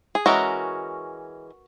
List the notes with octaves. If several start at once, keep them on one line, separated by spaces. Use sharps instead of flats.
G#4
E3 G#3 C#4 F#4 A#4